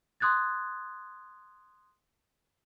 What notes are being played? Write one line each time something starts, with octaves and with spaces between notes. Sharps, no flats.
C6 D#6 F#6 G#6 A6